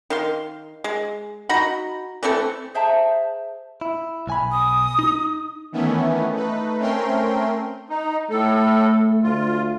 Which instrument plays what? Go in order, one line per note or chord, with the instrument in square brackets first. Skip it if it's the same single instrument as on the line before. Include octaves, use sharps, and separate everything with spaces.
[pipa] D#3 F5 C6
G#3
D#4 F#4 A#5 B5
E3 A3 C4 A4
[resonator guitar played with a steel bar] G#4 C5 E5 G5 A5 A#5
[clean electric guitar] E4
B1 G#5 B5
[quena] D#6
[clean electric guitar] D#4
[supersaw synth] D#3 E3 A3 B3 C#4 E4
A3 D#4 B4
A3 C4 C#4 A#4 G5 C6
[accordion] D#4
[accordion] A2 A4 [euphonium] A3
[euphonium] D2 [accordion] F4